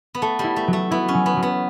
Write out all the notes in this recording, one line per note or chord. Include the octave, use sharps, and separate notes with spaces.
B3
A3 A4
G3 E4
A3
F#3
A3
B3 E4
C#4
F#3
B3
F#3
B3